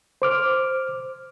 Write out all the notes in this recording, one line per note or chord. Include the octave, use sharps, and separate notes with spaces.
C5 D6 F6